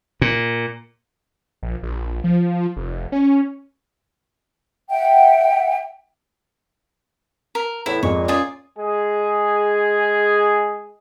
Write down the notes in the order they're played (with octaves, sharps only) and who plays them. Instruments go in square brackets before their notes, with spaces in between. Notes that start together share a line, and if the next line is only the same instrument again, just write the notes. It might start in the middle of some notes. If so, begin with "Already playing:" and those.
[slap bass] A#2
[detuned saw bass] A#1
A#1
F3
F1
C#4
[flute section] E5 F#5 G5
[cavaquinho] A#4
[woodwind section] E2 A2 [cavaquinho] E4
[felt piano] F2 [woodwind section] A#2 G#3 [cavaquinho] C#6
[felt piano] C#4 [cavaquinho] F4 G#4 D5
[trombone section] G#3 G#4